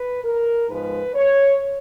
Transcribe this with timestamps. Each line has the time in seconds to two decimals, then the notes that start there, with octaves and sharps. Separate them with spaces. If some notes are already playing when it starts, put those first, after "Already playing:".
Already playing: B4
0.24 A#4
0.69 G#2 F3 G#3 B3 B4
1.14 C#5